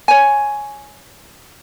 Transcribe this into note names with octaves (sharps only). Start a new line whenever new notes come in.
C#5 G#5